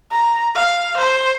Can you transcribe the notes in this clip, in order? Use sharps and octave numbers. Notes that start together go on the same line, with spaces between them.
A#5
F5
C5